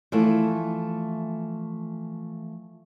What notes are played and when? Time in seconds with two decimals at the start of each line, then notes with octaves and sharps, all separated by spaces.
0.12 E3 F3 A3